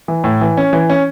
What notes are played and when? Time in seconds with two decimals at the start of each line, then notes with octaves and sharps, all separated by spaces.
0.08 E3
0.24 A2
0.41 E3
0.57 C#4
0.73 E3
0.90 C#4